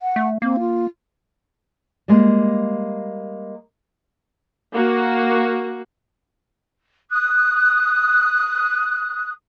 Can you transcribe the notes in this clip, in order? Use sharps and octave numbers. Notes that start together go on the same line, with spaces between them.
F#5
A3
A#3 C4
F4
G3 G#3 A#3
A#3 F#4
D#6 F#6